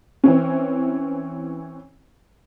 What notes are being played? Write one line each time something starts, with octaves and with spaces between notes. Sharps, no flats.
E3 C4 C#4